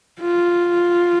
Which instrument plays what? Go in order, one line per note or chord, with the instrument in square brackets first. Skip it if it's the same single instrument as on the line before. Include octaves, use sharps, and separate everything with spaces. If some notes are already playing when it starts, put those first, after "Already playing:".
[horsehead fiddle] F4